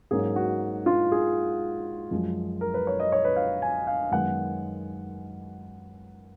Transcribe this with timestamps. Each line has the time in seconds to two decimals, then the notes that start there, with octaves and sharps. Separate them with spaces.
0.11 G#2 F#3 A#3 C#4 G#4
0.36 F#4
0.86 F4
1.12 G#4
2.11 F#2 F3 G#3
2.61 A#4
2.74 B4
2.87 C#5
3.00 D#5
3.12 C#5
3.25 B4
3.36 F5
3.62 G#5
3.87 F5
4.11 F#2 D#3 G#3 B3 F#5